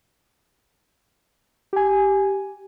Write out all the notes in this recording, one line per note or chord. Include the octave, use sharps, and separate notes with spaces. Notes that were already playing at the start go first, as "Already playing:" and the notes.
G4 G#5